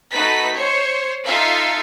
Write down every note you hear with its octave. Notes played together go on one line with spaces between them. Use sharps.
A3 D#4 F#4 B4 B6
C5 C#5
D#4 F4 A4 E5 F5